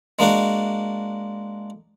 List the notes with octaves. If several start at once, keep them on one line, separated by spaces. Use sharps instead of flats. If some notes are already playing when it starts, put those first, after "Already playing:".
G#3 A#3 D4 F#4